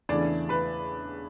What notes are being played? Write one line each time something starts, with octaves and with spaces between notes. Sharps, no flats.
E2 C#3 E3 A3 D4 E4 D5
B4 B5